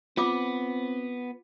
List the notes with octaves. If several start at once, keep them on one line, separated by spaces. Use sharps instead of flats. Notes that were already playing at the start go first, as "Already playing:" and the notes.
B3 C4 F4 D6